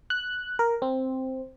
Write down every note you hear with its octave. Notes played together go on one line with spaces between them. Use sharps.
F#6
A#4
C4